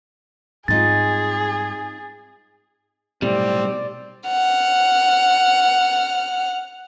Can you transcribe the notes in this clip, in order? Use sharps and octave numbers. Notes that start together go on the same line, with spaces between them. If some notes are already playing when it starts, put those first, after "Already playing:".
G#2 G3 C4 D#4 F4 G#4 A6
B1 A2 C3 G3 C4 D5
F#5 F6